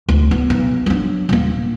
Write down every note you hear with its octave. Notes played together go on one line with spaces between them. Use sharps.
D2
B3
B1
F#3 D4
D#1 A#3